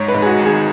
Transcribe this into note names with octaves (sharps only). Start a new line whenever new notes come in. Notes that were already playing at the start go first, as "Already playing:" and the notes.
Already playing: G#2 C#5
B4
G#2
G#4
F#4
G#1
G#4